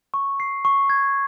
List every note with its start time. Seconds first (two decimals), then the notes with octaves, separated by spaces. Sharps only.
0.14 C#6
0.40 C7
0.65 C#6
0.90 G#6